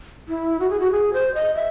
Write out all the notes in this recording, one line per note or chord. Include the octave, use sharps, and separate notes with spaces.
E4
F#4
G#4
F#4
G#4
C5
D#5
E5